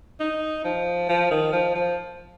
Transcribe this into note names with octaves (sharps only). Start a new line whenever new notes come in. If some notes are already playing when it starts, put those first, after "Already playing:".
D#4
F3
F3
D#3
F3
F3